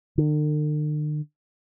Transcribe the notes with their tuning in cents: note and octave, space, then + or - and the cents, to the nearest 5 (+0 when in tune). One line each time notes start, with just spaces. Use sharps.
D3 +45